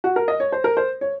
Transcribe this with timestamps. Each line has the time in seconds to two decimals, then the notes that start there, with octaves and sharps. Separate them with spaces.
0.04 F#4
0.16 A#4
0.28 D#5
0.40 C#5
0.52 C5
0.64 A#4
0.77 C5
1.01 C#5